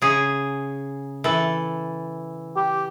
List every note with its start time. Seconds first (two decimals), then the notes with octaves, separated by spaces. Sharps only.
0.02 C#3 G#4
1.24 E3 A4
2.56 G4